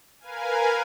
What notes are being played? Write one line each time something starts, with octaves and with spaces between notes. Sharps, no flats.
A#4 B4 F5 G#5